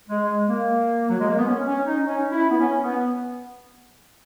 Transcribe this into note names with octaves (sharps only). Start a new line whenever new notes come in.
G#3
A#3
F#3
G#3
A#3
B3
C#4
C#4
D#4
C#4
E4
B3
C#4
B3